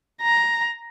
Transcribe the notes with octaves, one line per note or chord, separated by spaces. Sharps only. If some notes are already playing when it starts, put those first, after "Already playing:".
A#5